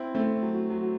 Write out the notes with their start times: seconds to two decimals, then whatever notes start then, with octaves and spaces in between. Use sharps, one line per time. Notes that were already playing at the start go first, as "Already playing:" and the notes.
Already playing: C4 E4
0.15 A3 C4
0.43 F#3
0.70 F#3